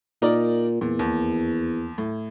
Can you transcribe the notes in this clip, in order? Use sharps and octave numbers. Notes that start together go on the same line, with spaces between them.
A#2 D#4 A#4 D5
E2 A#2
D#2
A2